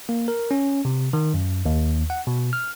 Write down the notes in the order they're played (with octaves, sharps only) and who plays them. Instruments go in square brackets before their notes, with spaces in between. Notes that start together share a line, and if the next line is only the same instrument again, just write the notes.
[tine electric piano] A#3
A#4
C#4
C3
D#3
F#2
D#2
F#5
B2
F6